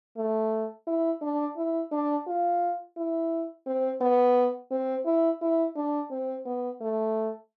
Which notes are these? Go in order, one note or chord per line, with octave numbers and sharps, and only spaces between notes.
A3
E4
D4
E4
D4
F4
E4
C4
B3
C4
E4
E4
D4
C4
B3
A3